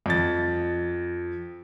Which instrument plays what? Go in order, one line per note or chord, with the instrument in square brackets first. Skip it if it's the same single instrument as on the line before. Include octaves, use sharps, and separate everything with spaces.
[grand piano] F2 A6